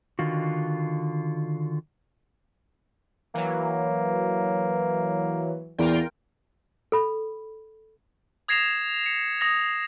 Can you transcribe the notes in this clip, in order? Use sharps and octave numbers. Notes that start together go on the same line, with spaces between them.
D3 D#3 F4 F#4
E3 F#3 A#3
E2 A#2 F4 A#4 G5
A4 B5
D#6 G#6 A#6 C7 E7 F7
C#7
D#6 A#6